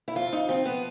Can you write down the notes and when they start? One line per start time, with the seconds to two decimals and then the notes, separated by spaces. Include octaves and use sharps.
0.08 E4
0.16 F2 F4
0.33 D#4
0.49 F3 C4
0.65 B3